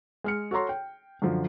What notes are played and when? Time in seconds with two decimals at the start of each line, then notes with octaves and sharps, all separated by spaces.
0.24 G#3 F6 C#7
0.51 F#4 A4 C#5 A#5 C6
0.69 G5
1.22 F#2 D3 F3